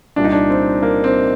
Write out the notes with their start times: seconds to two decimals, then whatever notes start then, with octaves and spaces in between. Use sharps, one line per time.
0.16 C2 A#2 G3 D4
0.24 D#4
0.32 D4
0.50 C4
0.83 A#3
1.04 C4